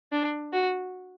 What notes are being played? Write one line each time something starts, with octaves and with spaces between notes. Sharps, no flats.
D4
F#4